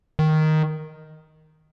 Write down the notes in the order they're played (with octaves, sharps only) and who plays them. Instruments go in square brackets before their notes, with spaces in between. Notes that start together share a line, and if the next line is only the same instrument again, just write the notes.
[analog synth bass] D#3